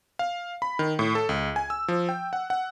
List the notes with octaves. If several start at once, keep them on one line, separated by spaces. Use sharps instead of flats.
F5
B5
D#3
A2
A4
C#2
G#5
E6
F3
G5
F#5
F#5